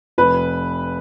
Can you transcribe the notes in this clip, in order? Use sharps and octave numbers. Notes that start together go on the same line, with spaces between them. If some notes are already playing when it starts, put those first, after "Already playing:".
F1 B4